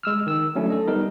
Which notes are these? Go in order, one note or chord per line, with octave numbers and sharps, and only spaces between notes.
G#3 E6 F6
D#3 E6
F#3 A3 C#4 D4 E4
A4 D#5
G3 B3 D#4 A#4